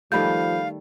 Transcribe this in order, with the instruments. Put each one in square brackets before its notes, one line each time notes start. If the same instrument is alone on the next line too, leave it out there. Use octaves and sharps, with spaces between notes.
[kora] D#3 G3 A3 [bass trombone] F3 [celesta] A4 B5 G6 [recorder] F5